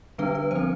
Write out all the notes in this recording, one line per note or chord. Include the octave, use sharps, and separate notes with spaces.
D3 G3 B3 D4 B4
B4
F3 C4 C5